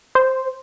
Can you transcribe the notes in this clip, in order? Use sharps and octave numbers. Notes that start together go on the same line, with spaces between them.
C5